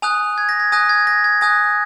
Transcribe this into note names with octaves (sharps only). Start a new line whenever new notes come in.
G#5 D#6 F#6 F7
G#6
A#6
G#6
G#5 D#6 F#6 A#6
G#6
A#6
G#6
G#5 D#6 F#6 A#6